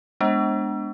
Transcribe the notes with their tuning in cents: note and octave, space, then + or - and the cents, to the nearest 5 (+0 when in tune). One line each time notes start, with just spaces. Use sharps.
G#3 +0 B3 +0 D4 +0